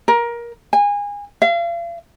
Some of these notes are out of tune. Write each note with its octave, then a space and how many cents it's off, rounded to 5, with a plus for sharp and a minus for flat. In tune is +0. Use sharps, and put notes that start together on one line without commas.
A#4 +20
G#5 -25
F5 -40